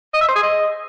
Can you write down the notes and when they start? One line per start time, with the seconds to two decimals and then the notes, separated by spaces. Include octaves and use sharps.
0.14 D#5
0.21 E5
0.28 C5
0.35 G#4
0.43 D#5